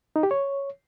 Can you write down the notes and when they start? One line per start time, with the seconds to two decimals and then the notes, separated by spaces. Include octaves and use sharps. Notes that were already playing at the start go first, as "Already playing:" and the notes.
0.16 D#4
0.23 G4
0.31 C#5